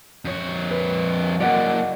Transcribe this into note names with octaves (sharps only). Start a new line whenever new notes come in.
F2 C#5
B4
F#3 A#3 D5 D#5 F#5